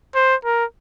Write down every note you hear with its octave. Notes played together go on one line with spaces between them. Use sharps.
C5
A#4